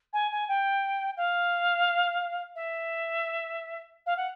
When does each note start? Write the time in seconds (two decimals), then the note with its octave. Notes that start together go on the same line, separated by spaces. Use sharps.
0.13 G#5
0.31 G#5
0.48 G5
1.17 F5
2.56 E5
4.06 F5
4.17 F#5